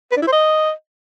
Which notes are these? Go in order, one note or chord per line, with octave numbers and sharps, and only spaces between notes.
B4
D4
E4
C5
D#5